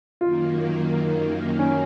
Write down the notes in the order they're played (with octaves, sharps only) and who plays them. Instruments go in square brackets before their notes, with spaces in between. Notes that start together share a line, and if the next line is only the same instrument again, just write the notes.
[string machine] F#2 D#3 A#3 [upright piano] F4
[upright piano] C#4